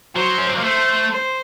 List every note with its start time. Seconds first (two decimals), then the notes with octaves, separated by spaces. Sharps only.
0.15 F#3 C5
0.38 C#4
0.47 C4
0.56 A#3
0.64 A3 C5
1.12 C5